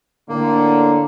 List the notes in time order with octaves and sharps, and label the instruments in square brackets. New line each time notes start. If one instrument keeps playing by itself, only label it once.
[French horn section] A2 D3 [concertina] A#3